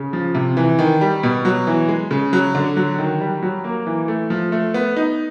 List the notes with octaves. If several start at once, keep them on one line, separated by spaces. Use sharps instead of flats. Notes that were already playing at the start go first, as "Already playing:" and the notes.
Already playing: C#3
F3
C3
E3
D#3
G3
B2
F#3
E3
G#3
C#3
F#3
D3
F#3
D#3
G3
F#3
A#3
E3
A3
F3
A3
B3
D#4